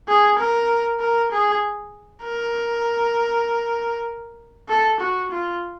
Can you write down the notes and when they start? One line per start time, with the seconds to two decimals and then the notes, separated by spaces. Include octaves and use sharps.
0.08 G#4
0.39 A#4
1.00 A#4
1.32 G#4
2.24 A#4
4.69 A4
5.00 F#4
5.31 F4